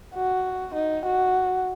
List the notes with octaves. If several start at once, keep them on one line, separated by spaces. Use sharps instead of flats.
F#4
D#4
F#4